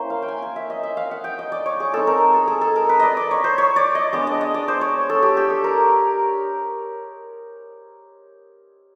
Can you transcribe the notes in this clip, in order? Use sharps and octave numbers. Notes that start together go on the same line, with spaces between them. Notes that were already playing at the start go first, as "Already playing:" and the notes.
Already playing: A#3 C#4 E4 C5
F5
G5
G#5
G#5
E5
D#5
E5
F5
F#5
G5
D#5
D5
C#5
G#4
G#3 C4 D#4 A4
A#4
A4
G#4
A4
A#4
B4
D5 D#5
D5
C#5
C5
C#5
D5
D#5
G#3 B3 D4 D5
D#5
D#5
D5
C5
C#5
A4
G4
G4
A4
A#4